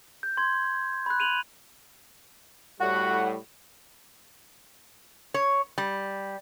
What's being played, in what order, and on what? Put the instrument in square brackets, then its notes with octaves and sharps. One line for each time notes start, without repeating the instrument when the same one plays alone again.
[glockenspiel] G6
C6 G#6
B5 F#6
D#7 F7 F#7
[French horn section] A2 G3 [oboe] F#4 [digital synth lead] F#5
[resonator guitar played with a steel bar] C#5
G3